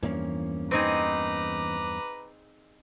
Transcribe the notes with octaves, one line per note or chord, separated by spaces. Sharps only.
E2 G2 E3 F3 A#3 C#4
C4 D#4 G#4 B4 A#5 D6